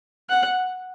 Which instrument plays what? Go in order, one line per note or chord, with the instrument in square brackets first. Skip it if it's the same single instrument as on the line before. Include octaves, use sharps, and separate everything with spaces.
[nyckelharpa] F#5